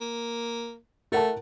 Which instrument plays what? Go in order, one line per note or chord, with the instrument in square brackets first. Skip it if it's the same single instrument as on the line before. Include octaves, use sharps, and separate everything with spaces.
[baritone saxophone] A#3
[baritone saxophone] A3 [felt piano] A#4 F#5 A5